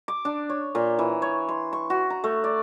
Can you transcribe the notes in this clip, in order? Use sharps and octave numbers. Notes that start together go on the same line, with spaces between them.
D6
D4
C#5
A#2
E3
C#5
C6
C#6
F#4
A#5
A3
D5